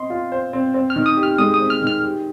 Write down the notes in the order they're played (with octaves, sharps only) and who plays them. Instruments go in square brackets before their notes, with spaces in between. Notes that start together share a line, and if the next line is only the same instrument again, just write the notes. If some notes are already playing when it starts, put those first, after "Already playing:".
Already playing: [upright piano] C4 D#5 [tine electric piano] C6
[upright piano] F4
C5
C4
C4
[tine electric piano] F6
[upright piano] D#3
[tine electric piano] D#6
[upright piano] G4
[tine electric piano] F6
[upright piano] G#3 [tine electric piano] D#6
[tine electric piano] D#6
[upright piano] C4
[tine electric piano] F6
[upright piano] D#3
[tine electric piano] F6
[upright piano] G4